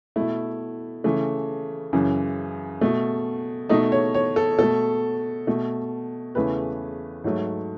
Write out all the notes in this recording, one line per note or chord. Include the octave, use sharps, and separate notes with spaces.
B2 A3 E4
C#3 E3 A3
F#2 C#3 E3
B2 A3
B2 A3 D#4
C#5
C#5
A4
B2 A3 A4
B2 A3
E2 C#3 E3 A3 B4
G#2 F#3 A3